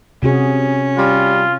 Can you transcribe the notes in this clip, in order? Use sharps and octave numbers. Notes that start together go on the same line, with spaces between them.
C3 C#4 F#4 G#4
G3 F4